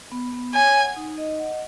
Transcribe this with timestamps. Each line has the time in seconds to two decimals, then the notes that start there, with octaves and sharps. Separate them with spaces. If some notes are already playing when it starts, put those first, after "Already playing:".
0.12 B3
0.33 B3
0.54 C#5 G#5
0.75 F#5
0.96 D#4
1.18 D#5
1.39 F#5